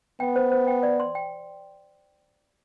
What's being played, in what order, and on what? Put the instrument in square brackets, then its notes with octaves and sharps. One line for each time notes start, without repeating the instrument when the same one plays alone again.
[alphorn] B3 [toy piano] G5
[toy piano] C5
C5
G5
D5
C6
G5